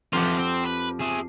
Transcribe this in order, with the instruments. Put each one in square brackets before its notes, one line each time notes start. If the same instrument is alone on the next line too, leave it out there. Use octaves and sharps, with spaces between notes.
[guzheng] F2 G4 F#5 [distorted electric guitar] E3 F4
[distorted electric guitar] C4
B4
G#4 E5